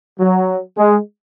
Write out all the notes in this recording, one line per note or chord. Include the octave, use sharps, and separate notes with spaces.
F#3
G#3